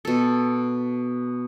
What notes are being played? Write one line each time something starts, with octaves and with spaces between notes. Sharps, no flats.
B2 A4